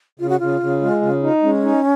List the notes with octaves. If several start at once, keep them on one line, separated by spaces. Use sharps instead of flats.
C#3 F4
F#4
C#3 F4
C#3
G#3
C#3
D#4
G#3 C#4
D#4